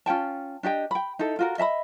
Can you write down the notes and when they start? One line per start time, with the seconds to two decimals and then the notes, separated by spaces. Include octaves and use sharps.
0.06 C#4 F4 G5 A5
0.63 D4 G4 D#5 G5
0.91 G5 B5
1.19 D#4 E4 A4
1.39 F4 F#4 A#4
1.58 D#5 E5 A5 B5